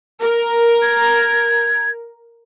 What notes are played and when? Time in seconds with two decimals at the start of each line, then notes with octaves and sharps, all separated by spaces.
0.22 A#4
0.82 G#6